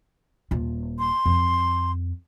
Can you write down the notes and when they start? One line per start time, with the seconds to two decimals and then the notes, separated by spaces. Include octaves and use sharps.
0.51 D#1 F4
0.99 C6
1.26 F2